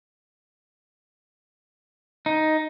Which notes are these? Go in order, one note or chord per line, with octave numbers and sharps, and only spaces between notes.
D#4